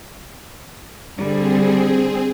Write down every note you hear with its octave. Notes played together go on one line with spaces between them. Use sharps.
D3 G3 C4 G#4